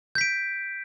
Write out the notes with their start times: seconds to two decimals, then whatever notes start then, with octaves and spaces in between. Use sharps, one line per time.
0.15 G6
0.18 B6
0.21 D7